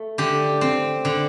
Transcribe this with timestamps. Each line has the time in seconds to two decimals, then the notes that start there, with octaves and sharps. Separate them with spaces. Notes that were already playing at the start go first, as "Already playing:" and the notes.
Already playing: A3 A4
0.18 D3 G4
0.61 C4
1.05 D3